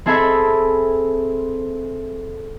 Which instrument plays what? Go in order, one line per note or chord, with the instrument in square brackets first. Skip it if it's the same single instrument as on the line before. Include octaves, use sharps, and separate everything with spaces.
[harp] C4 G#4 A4 E5 G#5 B5